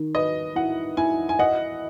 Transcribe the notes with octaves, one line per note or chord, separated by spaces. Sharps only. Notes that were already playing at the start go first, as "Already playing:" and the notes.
Already playing: D#3
B4 D#5
E4 F#5
E4 G#5
G#5
D#5 F#5